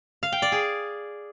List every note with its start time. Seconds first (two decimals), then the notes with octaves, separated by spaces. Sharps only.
0.23 F5
0.32 G5
0.42 D5
0.52 G#4